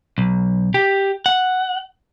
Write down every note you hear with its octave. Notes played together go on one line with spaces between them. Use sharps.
B1
G4
F#5